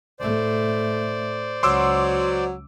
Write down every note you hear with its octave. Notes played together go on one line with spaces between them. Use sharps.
A2 A3 C5 D5
C#2 F#3 C6 D6 E6